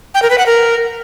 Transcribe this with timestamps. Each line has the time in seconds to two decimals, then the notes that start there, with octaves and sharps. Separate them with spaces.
0.15 G5
0.22 A#4
0.30 B4
0.38 F#5
0.46 A#4